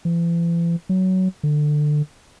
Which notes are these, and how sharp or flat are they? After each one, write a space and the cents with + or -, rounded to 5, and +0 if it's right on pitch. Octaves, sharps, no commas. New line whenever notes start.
E3 +45
F#3 +15
D3 +20